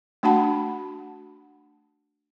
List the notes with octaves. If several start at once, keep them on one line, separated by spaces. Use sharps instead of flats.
A3 D4 F#4 F#5 A5 B5